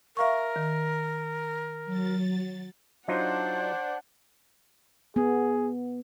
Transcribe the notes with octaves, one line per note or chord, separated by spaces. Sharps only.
A#4 E5 F5 C#6
D#3
F#3 A6
F#3 D4 D#4 F4 C5 F#5
B3 G#4